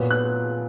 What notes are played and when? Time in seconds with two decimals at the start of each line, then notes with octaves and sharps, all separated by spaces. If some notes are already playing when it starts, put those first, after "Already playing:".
Already playing: A#2 F#3 B3
0.11 F#6